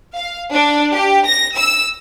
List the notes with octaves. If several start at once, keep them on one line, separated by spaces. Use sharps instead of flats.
F5
D4
G4
A#6
E6